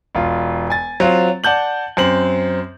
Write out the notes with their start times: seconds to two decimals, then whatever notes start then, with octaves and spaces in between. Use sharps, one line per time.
0.15 E1 F4
0.70 G#5 A6
1.00 F#3 C4 F4
1.44 D5 F#5 A5 G6 F#7
1.97 F#2 C4 F#7